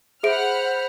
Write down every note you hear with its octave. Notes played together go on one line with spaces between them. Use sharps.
G#4 C5 E5 F#5 B5 F6 D7